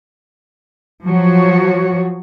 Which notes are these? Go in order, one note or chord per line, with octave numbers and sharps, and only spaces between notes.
F3 F#3 F#4 C#5